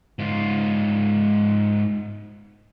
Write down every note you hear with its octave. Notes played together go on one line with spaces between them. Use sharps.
G#2 F4